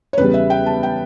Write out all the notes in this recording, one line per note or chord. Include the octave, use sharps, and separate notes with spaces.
C#5
E2 C#3 G3 B4
E5
G5
A5
G5